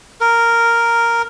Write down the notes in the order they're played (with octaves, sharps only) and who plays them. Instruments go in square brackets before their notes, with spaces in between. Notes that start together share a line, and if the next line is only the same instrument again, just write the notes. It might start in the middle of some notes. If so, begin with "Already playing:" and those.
[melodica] A#4